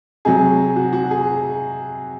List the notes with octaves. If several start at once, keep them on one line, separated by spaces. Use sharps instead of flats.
C3 F#3 G#4
F#4
F#4
G#4